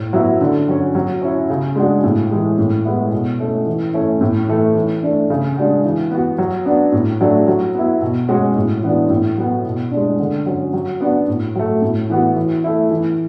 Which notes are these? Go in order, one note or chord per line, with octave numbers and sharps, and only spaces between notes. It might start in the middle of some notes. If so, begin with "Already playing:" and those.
Already playing: A2
F#3 B3 E4
D3
F#3 C#4
F#3
C#4 E4
C#3
G#3 D4 F#4
A2
E3 G#3
A2
G#3 B3 E4
B2
A3 C#4
E3
A3 C#4 E4
A2
E3 A3
E3
A3 D4
C#3
G#3 D4 F#4
E3
B3 F#4
F#3
B3 D4
A2
F#3 A3 D4
F#3
B3 E4
B2
G#3 C#4 F#4
A2
E3 B3 D4 F#4
A2
F#3 B3
B2
D4
G#3
D3
F#3 C#4
F#3
B3 D4 F#4
A2
F#3 A3
A2
E3 B3 F#4
E3
A3 E4
E3